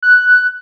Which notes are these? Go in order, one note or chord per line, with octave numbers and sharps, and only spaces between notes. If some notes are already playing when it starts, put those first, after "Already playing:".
F#6